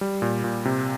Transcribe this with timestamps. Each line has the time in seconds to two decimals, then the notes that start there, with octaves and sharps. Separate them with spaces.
0.01 G3
0.22 A#2
0.44 A#2
0.65 C3